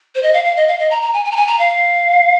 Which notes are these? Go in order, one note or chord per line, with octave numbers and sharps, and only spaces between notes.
C5
D#5
F5
F5
D#5
F5
D#5
A#5
A#5
G#5
G#5
A#5
G#5
A#5
F5